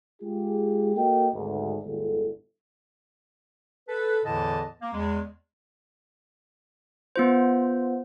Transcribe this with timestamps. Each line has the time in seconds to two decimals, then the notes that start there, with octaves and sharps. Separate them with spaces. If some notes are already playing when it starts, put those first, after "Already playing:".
0.22 G#3 F4 G4 G#4
0.96 A#3 F#4 A4 A#4 D#5 G5
1.33 G#1 D2 G#2
1.84 G1 D2 A2 G#3 E4 A4
3.88 A4 B4
4.25 E2 A2 D3 E3 D#5 A5
4.82 A#3
4.94 E2 G#3
7.16 B3 F4 C5